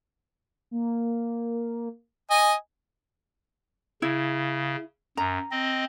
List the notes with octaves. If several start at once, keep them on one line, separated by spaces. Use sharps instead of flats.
A#3
D#5 G#5
C#3 E4
F#2 A#5
C4 D#5